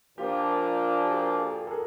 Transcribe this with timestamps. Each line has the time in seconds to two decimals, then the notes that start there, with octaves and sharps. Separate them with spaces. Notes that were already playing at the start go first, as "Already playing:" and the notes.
0.18 A#2 F3 A#3 D4 F4 G4
1.03 G4
1.10 F#4 G#4
1.41 G4 A4
1.67 A4
1.71 G#4 A#4